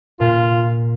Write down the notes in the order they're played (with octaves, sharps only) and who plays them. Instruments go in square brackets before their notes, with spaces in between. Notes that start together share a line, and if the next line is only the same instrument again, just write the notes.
[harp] A#2 [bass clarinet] F4